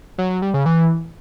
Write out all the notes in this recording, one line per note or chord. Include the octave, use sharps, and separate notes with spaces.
F#3
F#3
G3
C#3
E3